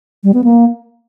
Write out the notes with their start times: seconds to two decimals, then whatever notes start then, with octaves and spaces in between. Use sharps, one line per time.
0.24 G3
0.34 B3
0.44 A#3